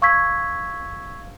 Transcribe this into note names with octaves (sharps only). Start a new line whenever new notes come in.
F5 C#6 E6 G#6 B6